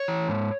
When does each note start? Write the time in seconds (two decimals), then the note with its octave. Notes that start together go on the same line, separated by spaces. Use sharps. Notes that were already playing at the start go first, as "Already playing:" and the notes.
Already playing: C#5
0.08 E3
0.29 G#2